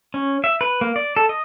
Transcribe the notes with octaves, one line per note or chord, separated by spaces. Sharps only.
C#4
E5
B4
A#3
D5
A4
D#5